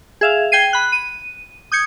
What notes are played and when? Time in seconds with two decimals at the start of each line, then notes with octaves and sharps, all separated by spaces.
0.21 G#4 E5 F5
0.52 G5 G#6 C7 D#7
0.73 B5 F#6
0.92 D#7
1.72 D#6 G6 G#6 C#7